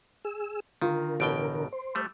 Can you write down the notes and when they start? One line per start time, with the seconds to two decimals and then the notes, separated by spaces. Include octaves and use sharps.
0.25 G#4 E6
0.82 D3 D#3 F4 A#4
1.20 A1 B2 G5 D7
1.72 C5
1.95 G3 A3